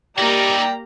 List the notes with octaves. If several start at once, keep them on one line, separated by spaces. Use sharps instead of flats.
A#3 D#4 E4 G4 D5 G5 A#5